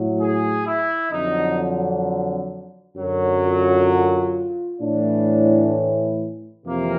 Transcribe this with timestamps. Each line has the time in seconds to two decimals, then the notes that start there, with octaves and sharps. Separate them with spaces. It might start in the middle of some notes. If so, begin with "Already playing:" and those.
Already playing: A2 F#3
0.19 G#4
0.65 E4
1.11 F2 D3 F#3 D#4
2.96 F#2 D3 F#3
3.42 F4
4.81 A2 E3 D4
6.66 F2 C3 E3 A#3